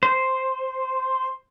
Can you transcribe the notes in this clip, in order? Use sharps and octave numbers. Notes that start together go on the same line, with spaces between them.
C5